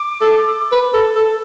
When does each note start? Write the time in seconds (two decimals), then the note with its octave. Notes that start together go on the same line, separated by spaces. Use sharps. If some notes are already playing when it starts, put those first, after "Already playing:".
Already playing: D6
0.21 A4
0.72 B4
0.94 A4
1.15 A4